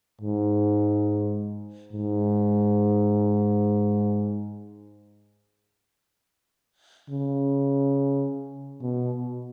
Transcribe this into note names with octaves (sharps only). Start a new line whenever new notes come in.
G#2
G#2
C#3
B2